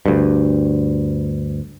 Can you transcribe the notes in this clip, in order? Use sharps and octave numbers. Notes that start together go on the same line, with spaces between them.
D2 G2